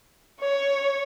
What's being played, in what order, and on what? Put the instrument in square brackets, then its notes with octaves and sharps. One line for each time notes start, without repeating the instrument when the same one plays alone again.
[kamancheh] C#5